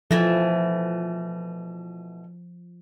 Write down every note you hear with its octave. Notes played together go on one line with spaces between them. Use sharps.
B2 E3 F3 A3